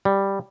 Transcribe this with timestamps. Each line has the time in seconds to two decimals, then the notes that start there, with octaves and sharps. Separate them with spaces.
0.05 G3